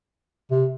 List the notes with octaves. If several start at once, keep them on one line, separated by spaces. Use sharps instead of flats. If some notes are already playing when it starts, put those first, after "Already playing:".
C3